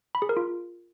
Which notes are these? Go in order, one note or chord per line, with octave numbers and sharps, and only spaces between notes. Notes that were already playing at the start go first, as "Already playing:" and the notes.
B5
G#4
A#4
F4